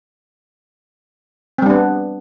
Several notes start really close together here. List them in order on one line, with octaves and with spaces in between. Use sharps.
C4 G3 D4 B3